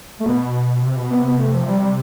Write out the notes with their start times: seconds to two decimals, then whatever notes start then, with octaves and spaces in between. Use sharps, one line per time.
0.20 A3
0.26 B2 B3
0.82 C3
0.96 B2
1.10 C3 B3
1.24 B3
1.38 A3
1.52 F3
1.66 C3 G3
1.80 G3